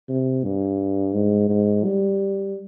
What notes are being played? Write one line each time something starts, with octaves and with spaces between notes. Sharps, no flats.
C3
G2
G#2
G#2
G3